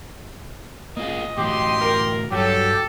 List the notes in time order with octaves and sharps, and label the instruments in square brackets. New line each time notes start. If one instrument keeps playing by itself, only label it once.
[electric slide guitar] A#3 F4 G#4 [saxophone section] D#5
[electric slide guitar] A2 E3 F#4 [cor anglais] G4 [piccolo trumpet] C6
[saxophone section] A#4
[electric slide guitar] G2 [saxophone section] F#3 [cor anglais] G4 [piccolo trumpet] A4